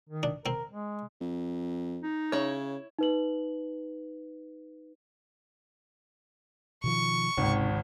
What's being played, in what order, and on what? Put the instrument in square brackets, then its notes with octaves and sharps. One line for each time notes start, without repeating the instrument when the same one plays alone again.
[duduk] D#3
[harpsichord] D4
[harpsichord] C4 [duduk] A#4
[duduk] G#3
[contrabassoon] F2
[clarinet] D#4
[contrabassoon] C#3 [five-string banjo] E4 C#5
[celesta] D#4 B4 F#7
[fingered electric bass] B2 D#3 F3 [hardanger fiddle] C#6
[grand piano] G#1 C#2 [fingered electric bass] C3 D#3